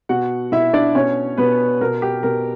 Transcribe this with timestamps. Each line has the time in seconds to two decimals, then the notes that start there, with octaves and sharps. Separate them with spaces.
0.09 B2 F#4 F#5
0.52 B2 E4 E5
0.73 D4 D5
0.95 B2 C#4 C#5
1.37 B2 B3 B4
1.81 B2 A#4
2.02 G4
2.23 B2 A#4